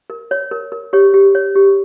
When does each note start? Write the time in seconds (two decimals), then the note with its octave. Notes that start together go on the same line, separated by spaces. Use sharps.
0.10 A#4
0.31 C#5
0.51 A#4
0.72 A#4
0.93 G4 C#5
1.14 G4
1.35 C#5
1.56 G4